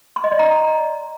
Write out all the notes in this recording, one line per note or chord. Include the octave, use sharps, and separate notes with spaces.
C6
D#5
D5
A#5